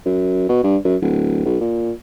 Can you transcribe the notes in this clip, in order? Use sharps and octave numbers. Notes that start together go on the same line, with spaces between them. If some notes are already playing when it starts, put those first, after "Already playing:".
F#2
B2
G2
F#2
D1
B1
A#2